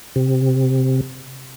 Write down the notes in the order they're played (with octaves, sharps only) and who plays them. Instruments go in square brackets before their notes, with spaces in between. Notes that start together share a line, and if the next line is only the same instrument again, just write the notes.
[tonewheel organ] C3